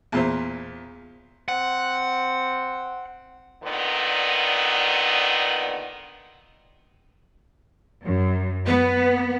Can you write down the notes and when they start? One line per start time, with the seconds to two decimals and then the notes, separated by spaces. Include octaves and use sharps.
0.12 E2 A#2 C5
1.48 C4 F#5
3.64 A#2 D3 D#3 B3
8.04 F#2
8.67 B3 B4